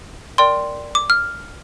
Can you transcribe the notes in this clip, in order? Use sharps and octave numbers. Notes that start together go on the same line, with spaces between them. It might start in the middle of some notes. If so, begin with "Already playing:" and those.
A#4 D5 G5 C6
D6
F6